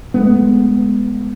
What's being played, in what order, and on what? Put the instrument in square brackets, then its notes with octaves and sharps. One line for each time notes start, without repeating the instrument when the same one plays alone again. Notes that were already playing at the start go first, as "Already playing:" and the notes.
[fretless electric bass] G#3 A3 B3